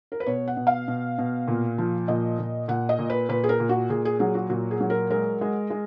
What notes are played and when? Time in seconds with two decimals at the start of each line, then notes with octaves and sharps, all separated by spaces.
0.12 A#4
0.20 B4
0.26 B2 C#5
0.48 F#5
0.57 B2
0.67 F5
0.88 B2
1.18 B2
1.48 A#2
1.78 F3
2.08 A#2 D#5
2.39 A#2
2.68 A#2 F#5
2.89 D#5
2.99 A#2
3.10 B4
3.29 A#2 B4
3.44 G#4
3.49 A#4
3.60 A#2
3.69 F#4
3.90 A#2 G#4
4.05 G#4
4.19 F#3 G#4
4.35 F#4
4.50 A#2 F#4
4.71 G#4
4.80 F#3
4.90 A#4
5.10 G#3 A#4
5.41 G#3
5.70 G#3